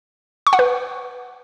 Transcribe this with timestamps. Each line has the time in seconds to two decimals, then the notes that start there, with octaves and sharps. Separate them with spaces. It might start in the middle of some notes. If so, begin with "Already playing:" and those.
0.47 C#6
0.53 F#5
0.59 B4